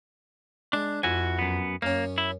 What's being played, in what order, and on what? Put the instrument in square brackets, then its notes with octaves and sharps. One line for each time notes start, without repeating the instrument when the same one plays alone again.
[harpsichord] G#3 [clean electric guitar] D4
[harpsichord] F2 [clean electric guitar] E4 F#4 G#5
[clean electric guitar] F#2 B3
[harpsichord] F#2 C#4 [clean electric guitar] A#3
[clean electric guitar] E4